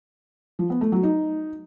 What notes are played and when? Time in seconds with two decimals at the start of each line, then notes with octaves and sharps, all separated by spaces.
0.59 F3
0.70 B3
0.81 A3
0.92 F#3
1.03 D#4